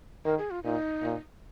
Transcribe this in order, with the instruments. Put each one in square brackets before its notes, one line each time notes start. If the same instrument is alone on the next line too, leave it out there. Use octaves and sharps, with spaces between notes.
[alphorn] D#3 [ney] A#4
[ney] G#4
F4
[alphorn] A#2 [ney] D#4
[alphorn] A#2